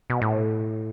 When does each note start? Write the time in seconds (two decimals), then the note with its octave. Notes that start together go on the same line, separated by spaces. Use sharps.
0.10 B2
0.22 A2